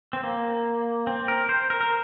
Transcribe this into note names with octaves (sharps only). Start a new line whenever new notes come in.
C4
A#3
C4
A#4
C5
A#4
A#4